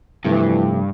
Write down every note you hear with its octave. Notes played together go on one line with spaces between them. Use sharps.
G2 C3 E3 F3 A3